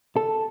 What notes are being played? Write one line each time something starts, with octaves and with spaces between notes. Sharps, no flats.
A4